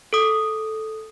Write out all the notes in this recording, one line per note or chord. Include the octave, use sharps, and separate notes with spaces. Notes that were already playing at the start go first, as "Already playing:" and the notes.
A4 D#6